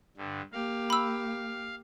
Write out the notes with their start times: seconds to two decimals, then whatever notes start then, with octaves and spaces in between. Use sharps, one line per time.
0.17 G2 D3
0.52 A#3 G4 F5
0.90 B5 E6